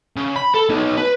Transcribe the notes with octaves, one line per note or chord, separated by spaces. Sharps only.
C#3
B5
A4
B3 D#4
B4